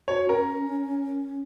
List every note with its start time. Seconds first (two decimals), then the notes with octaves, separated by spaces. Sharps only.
0.08 F#4 C#5
0.28 C#4 A#4